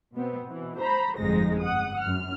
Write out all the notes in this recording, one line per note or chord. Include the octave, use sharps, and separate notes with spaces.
B2 B3 C4
B2 E3
C5 A#5 B5
G1 F2 G#2 G#3 D#4 A#6
F#5 D#6
F#2 F6